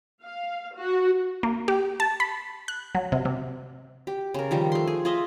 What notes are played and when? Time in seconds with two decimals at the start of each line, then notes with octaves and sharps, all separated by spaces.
0.22 F5
0.75 F#4
1.43 A#3
1.68 G4
2.00 A5
2.20 B5
2.68 F#6
2.95 F#3
3.12 C3
3.25 C3
4.07 G4
4.34 C#3 A#4
4.51 D#3 F3 G3
4.72 A3 C6
4.87 G#4
5.05 F4 G#4 D#5 E5